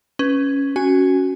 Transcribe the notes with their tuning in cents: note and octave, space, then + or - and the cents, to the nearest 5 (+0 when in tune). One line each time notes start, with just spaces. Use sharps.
C#4 +0 B4 +0
C#4 +0 F#4 +0 G#5 +0